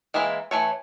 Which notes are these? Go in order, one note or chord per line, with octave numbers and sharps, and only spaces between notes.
E3 G#3 A#3 E4
E3 A3 C#5